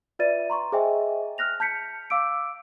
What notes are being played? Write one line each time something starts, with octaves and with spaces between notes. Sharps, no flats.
F4 B4 D5 E5 A6 D#7
A#5 C6 C#6
G#4 C5 D#5 E5 G5 G#5
F6 F#6 A#6 F7
A5 G6 B6 C#7
F5 D6 E6 D7